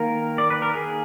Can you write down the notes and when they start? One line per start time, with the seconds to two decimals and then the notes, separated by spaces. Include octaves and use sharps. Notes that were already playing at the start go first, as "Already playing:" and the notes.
Already playing: D#3 A#3 A#4
0.38 D5
0.50 B4
0.62 A#4
0.74 G#4